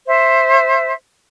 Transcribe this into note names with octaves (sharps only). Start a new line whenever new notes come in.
C5 E5